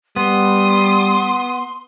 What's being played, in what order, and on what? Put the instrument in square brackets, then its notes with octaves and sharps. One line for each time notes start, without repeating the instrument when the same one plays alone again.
[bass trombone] G3 [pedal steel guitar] B3 [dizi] C6 [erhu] D#6